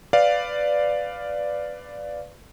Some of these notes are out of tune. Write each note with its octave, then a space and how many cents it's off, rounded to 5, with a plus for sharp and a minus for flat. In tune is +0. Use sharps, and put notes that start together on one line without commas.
B4 +20 D5 +0 F5 +0